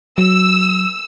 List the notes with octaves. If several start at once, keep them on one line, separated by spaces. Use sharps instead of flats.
F#3 E6